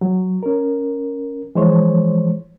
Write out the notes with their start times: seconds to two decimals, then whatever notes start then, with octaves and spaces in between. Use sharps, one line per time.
0.01 F#3
0.43 C#4 A#4
1.55 E3 F3 G#3 C5 C#5